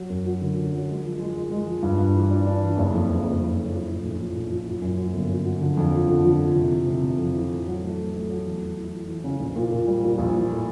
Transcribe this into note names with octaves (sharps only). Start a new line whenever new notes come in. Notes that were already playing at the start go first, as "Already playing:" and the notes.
Already playing: F#3
F#2
F#3
D3
F#3
F#3
G#3
F3
G#3
G#3
G#3
F3
G2
G2
E3
D4
D4
E3
F#1
F2
F#1
F#1
F2
F#1
F3
A2
A#1
F3
A#1
F3
F#3
F#2
F#3
G1
F#3
F#3
D3
F2
F3
D3
F3
F3
C3
E3
C3
C3
F2
E3
A2
F#3
A3
A3
A3
F#3
E2
E3
E3
E3
E3
C#3
A#1
A#2
A#2
G3
A#2
A#1
E3
A2